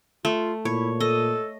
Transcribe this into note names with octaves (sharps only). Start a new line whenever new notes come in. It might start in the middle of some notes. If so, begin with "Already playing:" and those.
A3 F4
A#2 E4 C#5
A4 D#5